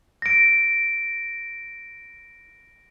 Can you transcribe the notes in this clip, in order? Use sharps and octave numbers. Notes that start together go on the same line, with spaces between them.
A#6 D7